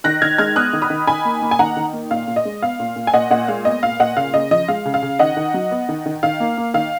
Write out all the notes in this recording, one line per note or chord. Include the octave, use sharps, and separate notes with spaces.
D#3 F#6 A#6
D#3 F6 G#6
G#3 F6 G#6
B3 D#6 F#6
D#3
B5 D#6
D#3
D#3 G#5 B5
A#3
A#3
G#5
D#3 F#5 A#5
D#3
A#3
A#2 F5
A#2
D#5
G#3
B3 F5
A#2
A#2
G#5
A#2 D#5 F#5
A#2 D#5 F#5
G#3 F5
B3 D#5
A#2 F5
A#2 D#5 F#5
C#3 F5
C#3 D#5
F3 D#5
G#3 F5
C#3
F5
C#3
D#3 D#5 F#5
D#3
F#3
B3
D#3
D#3
D#3 F5
A#3
A#3
D#3 F5